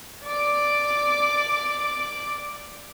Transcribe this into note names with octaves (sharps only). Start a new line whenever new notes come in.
D5 D6